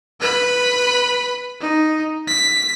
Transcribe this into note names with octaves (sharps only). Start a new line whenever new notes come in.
B4 B5
D#4
B6